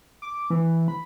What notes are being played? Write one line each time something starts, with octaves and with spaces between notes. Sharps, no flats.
D6
E3
B5